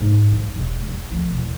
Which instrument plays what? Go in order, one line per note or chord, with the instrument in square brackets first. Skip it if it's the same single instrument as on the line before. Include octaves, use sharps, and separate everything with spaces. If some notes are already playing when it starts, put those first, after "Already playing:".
[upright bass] G#2
F3 G3
E1
E2
D2 F3
E2 B2